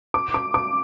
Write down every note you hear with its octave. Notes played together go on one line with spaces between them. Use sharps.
D6
D6
D6